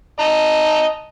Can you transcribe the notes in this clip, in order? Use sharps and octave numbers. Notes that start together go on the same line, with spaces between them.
D#5 A5 A#5